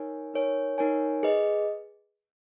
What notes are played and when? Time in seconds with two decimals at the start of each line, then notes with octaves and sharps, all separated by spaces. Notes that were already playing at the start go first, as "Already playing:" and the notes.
Already playing: D#4 A#4 C#5 G#5
0.34 D#4 A#4 C#5 G#5
0.78 D#4 A#4 C#5 G#5
1.23 G#4 B4 D#5